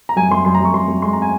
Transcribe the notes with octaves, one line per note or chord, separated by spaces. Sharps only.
A#5
F#2 G#5
F#2 C6
F#2 C6
A#5
F#2
C#6
F#2 C6
F#2
G#3 C6
A#5
G#5